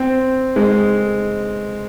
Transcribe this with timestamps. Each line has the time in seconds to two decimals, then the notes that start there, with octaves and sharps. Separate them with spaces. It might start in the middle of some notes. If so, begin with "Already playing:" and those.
Already playing: C4
0.56 G#3